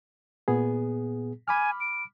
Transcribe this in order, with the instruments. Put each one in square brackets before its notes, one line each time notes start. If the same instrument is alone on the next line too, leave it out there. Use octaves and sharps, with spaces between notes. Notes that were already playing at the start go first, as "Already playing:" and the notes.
[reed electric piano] A#2 B3 G#4
[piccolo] G#5 [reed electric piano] B5 D6 F6
[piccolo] D7